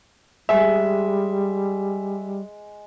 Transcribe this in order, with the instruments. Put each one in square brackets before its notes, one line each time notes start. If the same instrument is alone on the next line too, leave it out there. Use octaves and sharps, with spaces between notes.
[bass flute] G3 [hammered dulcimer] G#3 [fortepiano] E5